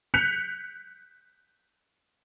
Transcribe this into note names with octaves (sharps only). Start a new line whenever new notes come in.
F#6 G6 B6 C#7 F7